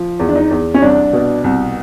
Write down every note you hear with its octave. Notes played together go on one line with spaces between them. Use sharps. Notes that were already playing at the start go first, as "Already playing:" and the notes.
Already playing: F3
E2
D4
D#4
E2
C#4
C2 D4
B2
C2